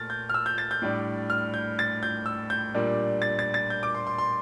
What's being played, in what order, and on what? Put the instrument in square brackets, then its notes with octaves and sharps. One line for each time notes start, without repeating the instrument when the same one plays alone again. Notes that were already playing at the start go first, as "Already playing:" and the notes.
Already playing: [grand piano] A#2 A3 F6 A6
G6
F6
E6
G6
A6
G6
A2 G3 D4
F6
G6
A6
G6
E6
G6
A#2 G3 A#3 D4
A6
A6
A6
G6
D6
C6
C6
C6